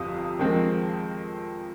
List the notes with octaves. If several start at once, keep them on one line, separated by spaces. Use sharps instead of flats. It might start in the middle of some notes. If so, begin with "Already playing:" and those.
Already playing: G1 F2 C3 D#6
F2 D#3 G#3 C4